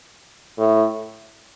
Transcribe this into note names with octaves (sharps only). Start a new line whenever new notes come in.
A2